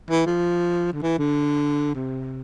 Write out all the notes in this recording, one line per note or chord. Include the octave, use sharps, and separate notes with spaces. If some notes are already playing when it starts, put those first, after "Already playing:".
E3
F3
D3
E3
D3
C3